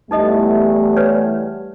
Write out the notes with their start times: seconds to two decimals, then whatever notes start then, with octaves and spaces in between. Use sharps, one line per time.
0.11 E2 G3 A3 D#4 A4 D#5
0.96 B4 C#5 D5